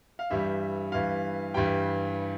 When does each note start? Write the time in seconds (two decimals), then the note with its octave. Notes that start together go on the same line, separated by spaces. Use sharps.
0.19 F5
0.30 G2 E3 G3 E5
0.92 G2 E3 G3 F5
1.54 G2 E3 G3 G5